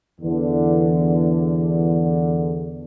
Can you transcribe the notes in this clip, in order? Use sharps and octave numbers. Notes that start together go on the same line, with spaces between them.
E2 D3